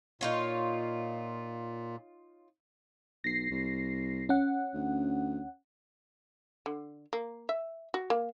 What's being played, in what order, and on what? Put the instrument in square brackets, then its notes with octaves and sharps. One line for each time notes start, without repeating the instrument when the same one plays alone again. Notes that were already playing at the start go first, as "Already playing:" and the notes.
[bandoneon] A#2 [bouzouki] D#4 F4 C#5
[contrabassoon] B1 [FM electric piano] A#6 C7
[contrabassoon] C2
[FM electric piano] C#4 F#5
[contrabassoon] D2
[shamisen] D3
A#3
E5
F#4
A#3